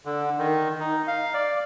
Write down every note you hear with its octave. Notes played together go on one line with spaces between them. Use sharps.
D3
D#3
D#4
F5
D5